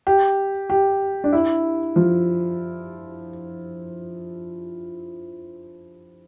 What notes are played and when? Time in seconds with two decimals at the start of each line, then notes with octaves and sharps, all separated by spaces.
0.07 G4
0.70 G4
1.24 D4
1.33 E4
1.96 F3